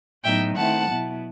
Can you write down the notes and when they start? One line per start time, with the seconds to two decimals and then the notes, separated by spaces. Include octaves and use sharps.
0.24 A2 F#3 B3 D#4 E5 G5
0.56 D#3 A3 C4 E4 F#5 A5
0.88 B2 F#3 B3 E4